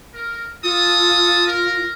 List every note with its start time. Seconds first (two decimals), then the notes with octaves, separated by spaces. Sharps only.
0.14 A#4
0.64 F4 A4 A5 D#6
1.47 A#4